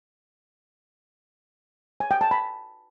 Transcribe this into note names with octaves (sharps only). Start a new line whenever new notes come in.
G#5
G5
A5
B5